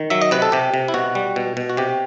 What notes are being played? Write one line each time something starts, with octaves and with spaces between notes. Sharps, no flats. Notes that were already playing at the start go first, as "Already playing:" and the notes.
Already playing: D#3
F#3 E5
D#5
C3 B4
A4
C3 G4
C3
E4
B2 F#4
G3
B2
B2
F#4
C3 G4